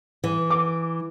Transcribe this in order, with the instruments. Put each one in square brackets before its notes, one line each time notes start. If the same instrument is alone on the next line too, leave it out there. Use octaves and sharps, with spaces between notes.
[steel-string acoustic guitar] E3
[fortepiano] D6